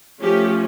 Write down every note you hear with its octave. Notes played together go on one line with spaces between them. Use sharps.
F3 A3 C#4 G4